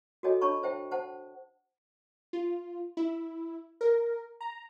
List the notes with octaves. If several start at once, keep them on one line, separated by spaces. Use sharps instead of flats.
F#4 G#4 A4 C#5 D#5 G#5
D4 C#5 A5 B5 C#6
C5 E5 G5 A5
C5 F#5 A5
F4
E4
A#4
A#5